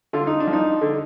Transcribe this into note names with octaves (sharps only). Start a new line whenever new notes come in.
D3 F4
D#4
D4
F3
D#4
D3